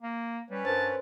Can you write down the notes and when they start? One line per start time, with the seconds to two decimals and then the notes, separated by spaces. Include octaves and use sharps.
0.02 A#3
0.50 G3 C#4 B4 C#5
0.65 G2 A#4 C5 A5